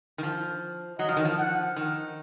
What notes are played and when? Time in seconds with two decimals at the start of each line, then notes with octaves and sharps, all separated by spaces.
0.18 D#3
0.23 F3
0.99 F#3 D#5
1.08 F3
1.17 D#3
1.25 F3
1.38 F#5
1.76 D#3